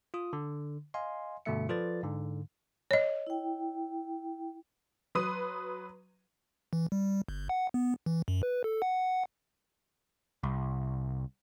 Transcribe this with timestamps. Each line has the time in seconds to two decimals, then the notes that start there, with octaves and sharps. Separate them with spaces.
0.14 F4 D#6
0.33 D3
0.94 D#5 F5 G#5 C6
1.45 G2 B2 D3 A3 E5 C#7
1.69 F3 F4 A4 B4 D5 A6
2.03 G#2 D3
2.91 C#5 D#5
3.27 E4 G5
5.15 F#3 B4 C6 D#6 D#7
6.73 E3
6.92 G3
7.28 G1
7.49 F#5
7.74 B3
8.06 E3
8.28 F#2
8.43 B4
8.64 A4
8.82 F#5
10.43 C2